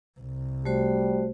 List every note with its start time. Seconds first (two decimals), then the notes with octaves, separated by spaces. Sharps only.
0.20 C2
0.65 G3 A3 F#4 C5